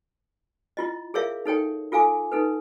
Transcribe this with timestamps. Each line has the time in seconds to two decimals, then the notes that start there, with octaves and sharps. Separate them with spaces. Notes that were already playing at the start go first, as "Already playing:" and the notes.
0.77 E4 F4 D#5
1.14 G#4 A#4 C#5 E5 F5
1.45 D#4 A4 C#5 G5
1.92 F4 A4 F5 G#5 D6
2.32 D#4 A4 B4